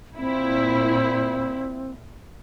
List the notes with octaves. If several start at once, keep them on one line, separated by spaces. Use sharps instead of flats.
A#2 C4 E4